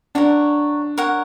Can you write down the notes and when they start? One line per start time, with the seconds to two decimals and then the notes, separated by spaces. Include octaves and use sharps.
0.15 D4 A#4 C#5 F#5
0.98 A#4 C#5 F#5